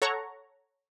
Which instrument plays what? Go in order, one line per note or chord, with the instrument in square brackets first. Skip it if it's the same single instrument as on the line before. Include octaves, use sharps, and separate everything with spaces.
[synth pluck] A4 C#5 F#5 A#5 C#6